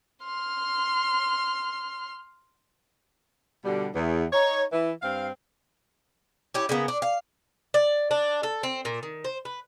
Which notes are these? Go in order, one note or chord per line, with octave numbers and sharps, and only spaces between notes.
C6 F6
B2 D3 G3
E2
D#4 C#5
E3
G2 C4 F5
C#4 E4 G4
C#3 A#3 B3
D4
F5
D5
D4
A4
C4
A#2
D#3
C5
B4